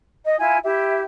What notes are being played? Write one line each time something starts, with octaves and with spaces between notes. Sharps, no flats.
D#5
E4 F4 G#5
E4 G4 E5